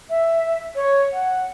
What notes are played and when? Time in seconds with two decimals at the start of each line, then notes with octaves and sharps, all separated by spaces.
0.10 E5
0.76 C#5
1.13 F#5